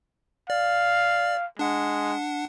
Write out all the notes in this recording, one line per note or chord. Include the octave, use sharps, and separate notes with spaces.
D5 F5
G#3 D4 F#5